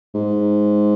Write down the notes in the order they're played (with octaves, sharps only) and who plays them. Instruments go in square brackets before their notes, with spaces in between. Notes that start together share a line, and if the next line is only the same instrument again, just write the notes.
[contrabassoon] G#2